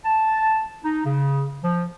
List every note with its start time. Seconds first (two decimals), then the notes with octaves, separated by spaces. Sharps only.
0.05 A5
0.84 D#4
1.05 C#3
1.64 F3